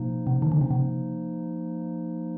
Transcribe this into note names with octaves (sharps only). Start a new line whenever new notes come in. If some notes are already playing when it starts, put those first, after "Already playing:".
Already playing: B2 F3 A#3 D#4
C3
D#3
D3
C#3
C3